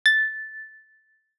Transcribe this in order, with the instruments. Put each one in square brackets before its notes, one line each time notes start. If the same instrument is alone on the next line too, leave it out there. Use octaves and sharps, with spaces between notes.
[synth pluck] A6